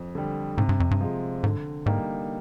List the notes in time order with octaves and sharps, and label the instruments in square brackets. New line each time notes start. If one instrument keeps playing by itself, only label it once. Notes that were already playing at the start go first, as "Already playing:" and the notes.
Already playing: [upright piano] F2
D3 G3
[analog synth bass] G#2 [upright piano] C3
[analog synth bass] G2
F2
G2
[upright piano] F3 G#3
[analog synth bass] G#2 [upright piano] D3
[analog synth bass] G#2 [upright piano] G3 A#3 D#4